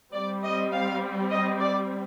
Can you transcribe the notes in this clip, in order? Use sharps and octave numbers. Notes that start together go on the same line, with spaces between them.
G3 C4 D5
D#5
F5
D#5
D5